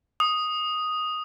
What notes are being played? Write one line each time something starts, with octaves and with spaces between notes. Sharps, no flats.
D#6